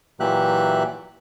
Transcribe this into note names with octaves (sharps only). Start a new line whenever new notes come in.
A#2 E3 F#3 G4 E5 F#6